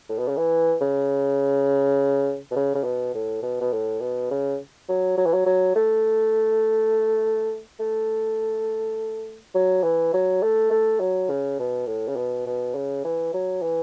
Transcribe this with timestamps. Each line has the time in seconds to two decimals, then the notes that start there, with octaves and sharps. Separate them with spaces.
0.09 A2
0.18 B2
0.28 C#3
0.37 E3
0.81 C#3
2.51 B2
2.56 C#3
2.75 C#3
2.84 B2
3.14 A2
3.43 B2
3.61 B2
3.73 A2
4.00 B2
4.31 C#3
4.89 F#3
5.18 F#3
5.26 E3
5.34 F#3
5.46 F#3
5.76 A3
7.80 A3
9.55 F#3
9.83 E3
10.13 F#3
10.43 A3
10.71 A3
11.00 F#3
11.29 C#3
11.59 B2
11.87 A2
12.08 C#3
12.16 B2
12.46 B2
12.75 C#3
13.05 E3
13.34 F#3
13.62 E3